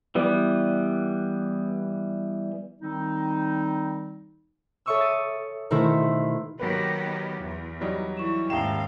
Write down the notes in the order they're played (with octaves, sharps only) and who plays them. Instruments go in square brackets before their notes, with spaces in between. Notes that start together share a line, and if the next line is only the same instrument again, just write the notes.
[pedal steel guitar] E3 G3 B3
[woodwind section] D#3 G3 C4 D#4
[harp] A4 C#5 E5 C#6 D#6 E6
A6 D#7
B2 D#3 A3 E4 C5
[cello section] D#3 B3 G4 [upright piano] F#3 A#3 B4
[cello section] E2
[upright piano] F#3 G3 D#4
[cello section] E3 [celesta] E4 C#6 E7
[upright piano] D#1 E5 E7 [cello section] D#2 G#2 F5 [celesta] G5 G7